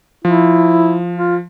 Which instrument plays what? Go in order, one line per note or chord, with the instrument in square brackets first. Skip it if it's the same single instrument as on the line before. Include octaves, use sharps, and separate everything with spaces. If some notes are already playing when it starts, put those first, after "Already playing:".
[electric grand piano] F3 [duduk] E4
[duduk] F4